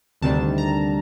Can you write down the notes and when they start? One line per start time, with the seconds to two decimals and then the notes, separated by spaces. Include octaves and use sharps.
0.22 D2 C3 D#3 G3 D4 A5
0.58 A#5